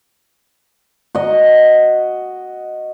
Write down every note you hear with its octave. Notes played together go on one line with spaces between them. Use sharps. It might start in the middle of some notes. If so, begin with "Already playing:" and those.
F#4 D#5